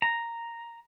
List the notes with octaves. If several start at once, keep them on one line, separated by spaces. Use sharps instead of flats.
A#5